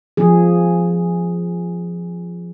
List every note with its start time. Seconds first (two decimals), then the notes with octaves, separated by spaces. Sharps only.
0.17 F3 G#4